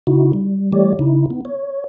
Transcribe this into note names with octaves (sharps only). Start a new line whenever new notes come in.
C#3 D#4 E4 F#4
G3
E3 G3 A3 G4 C#5 D5
C#3 D#4 E4
B3
C#5